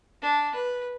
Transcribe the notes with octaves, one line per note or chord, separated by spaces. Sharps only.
D4
B4